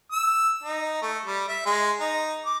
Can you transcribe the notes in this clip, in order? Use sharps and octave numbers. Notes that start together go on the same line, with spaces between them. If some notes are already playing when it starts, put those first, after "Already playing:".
E6
D#4
A3
G3
E5
G#3
D#4
D6